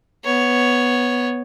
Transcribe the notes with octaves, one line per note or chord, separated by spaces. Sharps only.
B3 C#5